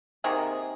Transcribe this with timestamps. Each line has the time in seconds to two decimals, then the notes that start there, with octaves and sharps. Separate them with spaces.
0.24 C3 D#3 A#3 G#4